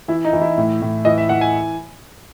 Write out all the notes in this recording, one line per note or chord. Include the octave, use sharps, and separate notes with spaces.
E3 E4
D#4
E3
E4
A2
A2
E3 D#5
E5
E3 F#5
G#5